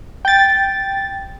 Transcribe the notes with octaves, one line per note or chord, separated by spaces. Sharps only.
G5 A6